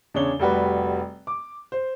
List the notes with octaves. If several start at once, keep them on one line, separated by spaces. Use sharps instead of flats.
E2 C#3 D4 C#5 G7
F1 G3 F#4 B4
D6
C5